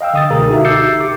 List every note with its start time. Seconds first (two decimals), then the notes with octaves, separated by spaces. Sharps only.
0.01 D#5 F5 G5 E6
0.14 D3 D#6 A6
0.31 C#2 B2 D3 G#4 A#4 A#5
0.50 D#4 F#4 G4 A4 E5
0.65 D6 E6 G6 A6 C7 C#7
1.00 G4 D6